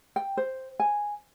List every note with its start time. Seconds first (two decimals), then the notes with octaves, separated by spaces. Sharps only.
0.16 G5
0.37 C5
0.80 G#5